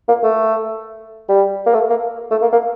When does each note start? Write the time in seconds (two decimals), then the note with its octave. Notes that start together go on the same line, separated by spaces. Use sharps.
0.08 A#3
0.23 A3
1.29 G3
1.66 A#3
1.74 A3
1.90 A#3
2.31 A3
2.42 A#3
2.53 A#3